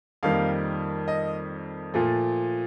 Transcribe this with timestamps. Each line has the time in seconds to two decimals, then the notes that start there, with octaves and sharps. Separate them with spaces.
0.23 F2 D#3 G3 A#3 F5
1.08 D#5
1.94 A#2 F3 A3